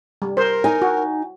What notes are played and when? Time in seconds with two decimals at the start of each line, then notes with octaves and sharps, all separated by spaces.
0.22 G3
0.37 A#4 C5
0.64 D#4 G#5
0.82 F#4